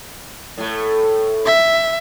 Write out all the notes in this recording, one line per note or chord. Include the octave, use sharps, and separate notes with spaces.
A2 A3
E5